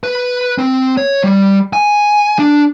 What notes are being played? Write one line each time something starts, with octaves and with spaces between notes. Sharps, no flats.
B4
C4
C#5
G3
G#5
D4